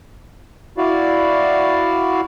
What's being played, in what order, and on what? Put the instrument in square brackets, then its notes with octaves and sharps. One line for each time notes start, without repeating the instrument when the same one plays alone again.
[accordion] E4 F#4 D5 F5